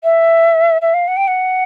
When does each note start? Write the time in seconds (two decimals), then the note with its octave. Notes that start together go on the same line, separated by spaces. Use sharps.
0.04 E5
0.82 E5
0.94 F5
1.08 F#5
1.17 G5
1.27 F#5